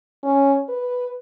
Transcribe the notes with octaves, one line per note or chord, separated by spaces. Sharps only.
C#4
B4